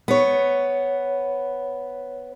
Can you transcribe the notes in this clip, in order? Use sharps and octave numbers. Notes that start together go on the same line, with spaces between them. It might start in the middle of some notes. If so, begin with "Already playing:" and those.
B3 C#5